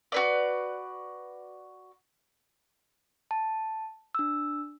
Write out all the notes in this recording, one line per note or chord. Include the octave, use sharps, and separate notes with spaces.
F#4 B4 D5
A5
D4 E6